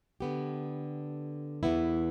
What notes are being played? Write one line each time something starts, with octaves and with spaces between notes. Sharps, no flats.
D3 B3 G4
E2 E3 B3 E4